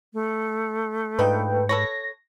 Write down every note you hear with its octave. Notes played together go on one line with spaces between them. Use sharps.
A3
G#2 F3 D4 D#4 B4 G5
A4 B4 C#5 A#6